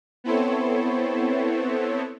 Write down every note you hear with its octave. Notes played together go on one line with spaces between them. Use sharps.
B3 C4 E4 A4 C5 C#5